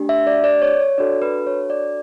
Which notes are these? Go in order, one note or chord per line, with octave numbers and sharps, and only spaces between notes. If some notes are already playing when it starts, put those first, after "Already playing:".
Already playing: A3 D4 G4
E5
D5
D5
C#5
C#5
D4 F#4 A4 D5
B4
C#5
D5